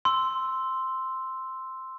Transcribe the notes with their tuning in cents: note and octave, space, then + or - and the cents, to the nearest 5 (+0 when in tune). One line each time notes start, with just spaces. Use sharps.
C6 +0 E6 +0